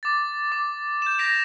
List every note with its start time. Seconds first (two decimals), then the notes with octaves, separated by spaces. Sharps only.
0.03 D6 A6
0.52 D6
1.02 G6 E7
1.18 G6 A#6 B6 D7 F7